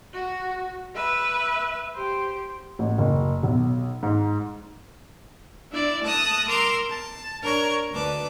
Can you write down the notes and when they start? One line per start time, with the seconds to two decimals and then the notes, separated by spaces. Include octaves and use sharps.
0.14 F#4
0.95 B4 E5
1.95 G4 C5
2.79 A1
2.98 F#1
3.43 B1
4.03 G#2
5.71 D4 E4 D5
6.02 A3 A5 D#6 F#6 A#6
6.46 A#4 A#5 C6 D6 E6
6.89 A5
7.43 D4 A#4 C#5 A#5 C#6
7.91 D2 D4 B4 A5 D6